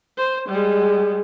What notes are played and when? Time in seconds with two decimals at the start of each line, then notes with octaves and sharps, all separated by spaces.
0.17 C5
0.49 G3 G#3